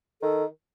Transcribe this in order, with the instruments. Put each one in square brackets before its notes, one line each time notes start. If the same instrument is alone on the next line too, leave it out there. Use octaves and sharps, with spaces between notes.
[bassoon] D#3 [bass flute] A4